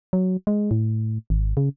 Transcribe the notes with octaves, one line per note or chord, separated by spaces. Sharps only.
F#3
G#3
A2
G#1
C#3